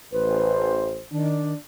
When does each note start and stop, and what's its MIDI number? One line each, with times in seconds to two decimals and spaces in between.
0.13 1.02 33
0.13 0.72 71
0.13 1.02 72
1.12 1.53 51
1.12 1.54 62